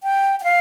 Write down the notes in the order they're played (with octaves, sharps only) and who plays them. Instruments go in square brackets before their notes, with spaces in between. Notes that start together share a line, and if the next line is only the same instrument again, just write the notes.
[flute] G5
G5
F5